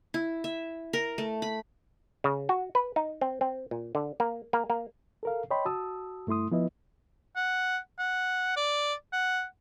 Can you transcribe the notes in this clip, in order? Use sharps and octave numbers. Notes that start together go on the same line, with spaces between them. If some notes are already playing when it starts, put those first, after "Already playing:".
E4
E5
A#4
A3
B5
C#3
F#4
B4
D#4
C4
C4
A#2
D3
A#3
A#3
A#3
A4 A#4 F5
C#5 D#5 G5 B5 C6
F#4 A5 D#6 E6
G2 A3 E4 C6 D#6
F3 B3 E4 B4 D#5 E5
F#5
F#5
D5
F#5